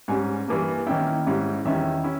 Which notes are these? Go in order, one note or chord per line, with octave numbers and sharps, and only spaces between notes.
G#2 G3 C#4 G#5
G2 E3 A#3
D#3 A#3 C#4 E4 G5
G#2 G3 C#4 E4
E2 D#3 G3 C#4 E4 E5
C#4 E4